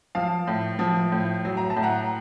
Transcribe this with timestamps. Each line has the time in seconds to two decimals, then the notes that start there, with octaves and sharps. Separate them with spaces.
0.15 F3 F5 A5
0.47 A2
0.79 F3
1.12 A2
1.45 F#3
1.57 A#5
1.70 A5
1.76 A2
1.83 F#5 A#5